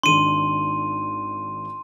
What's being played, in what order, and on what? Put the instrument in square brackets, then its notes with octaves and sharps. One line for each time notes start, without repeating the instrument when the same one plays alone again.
[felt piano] G#1 D#3 D4 [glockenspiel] C6 D#7